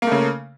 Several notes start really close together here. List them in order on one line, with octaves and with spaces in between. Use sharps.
A#3 A3 C#3